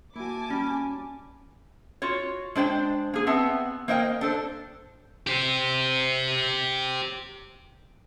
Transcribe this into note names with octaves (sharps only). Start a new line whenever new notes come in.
A#3 E4 F#4 G#5 A5 D6
G3 C#4
F4 F#4 C#5
G#3 D4 C5 G5
A#3 G#4
B3 C4 E5 F#5 A5
A#3 A#4 C5 D#5 F5 G5
D4 A4 C5
G4 C5